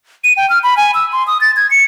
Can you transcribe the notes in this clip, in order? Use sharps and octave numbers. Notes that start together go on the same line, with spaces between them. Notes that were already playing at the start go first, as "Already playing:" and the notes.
D#7
G5
F6
B5
G#5
E6
C6
D#6
A6
G#6
C#7